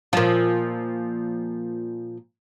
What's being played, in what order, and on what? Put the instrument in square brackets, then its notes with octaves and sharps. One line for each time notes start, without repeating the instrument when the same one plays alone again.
[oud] A#2 F3